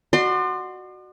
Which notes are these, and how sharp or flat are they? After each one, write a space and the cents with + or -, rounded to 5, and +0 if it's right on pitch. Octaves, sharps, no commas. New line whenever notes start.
F#4 +0 D5 +45 C6 +0